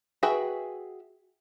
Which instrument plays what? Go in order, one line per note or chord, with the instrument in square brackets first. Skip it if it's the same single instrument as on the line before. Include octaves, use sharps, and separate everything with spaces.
[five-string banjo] F#4 G#4 B4 E5 G5